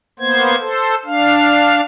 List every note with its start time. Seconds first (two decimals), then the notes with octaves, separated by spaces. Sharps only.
0.19 A#3 B3 C5 G#6
0.60 A4 C5
1.06 D4 F5